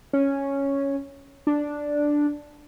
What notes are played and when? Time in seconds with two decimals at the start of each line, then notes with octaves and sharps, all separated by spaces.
0.13 C#4
1.47 D4